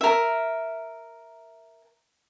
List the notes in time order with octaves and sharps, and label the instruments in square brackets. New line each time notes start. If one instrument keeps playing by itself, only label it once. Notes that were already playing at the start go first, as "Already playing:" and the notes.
[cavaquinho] A#4 E5